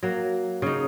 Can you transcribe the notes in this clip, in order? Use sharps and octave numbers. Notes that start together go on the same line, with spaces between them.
F#3 A#3
C#3 D#4